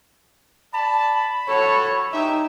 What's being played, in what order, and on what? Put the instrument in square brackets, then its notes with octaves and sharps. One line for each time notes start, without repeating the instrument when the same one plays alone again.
[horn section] D5 A5 [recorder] B5
[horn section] F#4 A4 [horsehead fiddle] C#5
[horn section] E3 G4 E5 [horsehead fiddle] D#4